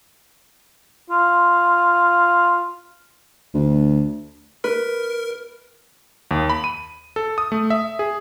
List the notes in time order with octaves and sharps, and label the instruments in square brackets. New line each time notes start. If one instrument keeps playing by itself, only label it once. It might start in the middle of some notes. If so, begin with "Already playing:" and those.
[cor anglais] F4
[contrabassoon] D2
[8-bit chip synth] A#4 [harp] B4
[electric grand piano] D#2
B5
D#7
A4
D#6
A3
E5
G#4